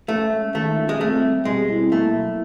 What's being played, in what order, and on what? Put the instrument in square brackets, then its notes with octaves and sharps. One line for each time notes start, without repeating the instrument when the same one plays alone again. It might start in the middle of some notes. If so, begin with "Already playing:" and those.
[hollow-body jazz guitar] A3 [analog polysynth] C#4
[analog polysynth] G#3
[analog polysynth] D#3 [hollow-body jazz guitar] A3
[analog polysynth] F4
[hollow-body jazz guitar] G#3
[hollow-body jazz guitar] A3 [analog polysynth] C4
[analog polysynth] G3
[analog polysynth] B2 [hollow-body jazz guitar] G#3
[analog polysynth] E4
[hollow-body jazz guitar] A3 [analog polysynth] A#3
[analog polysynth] F#3